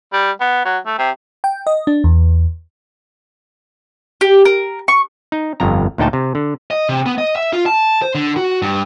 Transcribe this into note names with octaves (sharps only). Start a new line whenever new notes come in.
G3
B3
F#3
A3
C3
G5
D#5
D4
E2
G4
A#4
C#6
D#4
G1 F2 A#5
D2 A#2 D#4 G5 A5
C3
D3
D#5
C3
B3
D#5
E5
F4
A5
C5
D3
F#4
G2